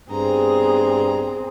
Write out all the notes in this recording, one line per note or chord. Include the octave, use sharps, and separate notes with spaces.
G2 B3 C4 G#4 A#5